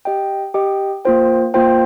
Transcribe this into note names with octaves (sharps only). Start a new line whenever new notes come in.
G4 D#5 G5
G4 D#5 G5
A#3 F4 C5 G5
A#3 F4 C5 G5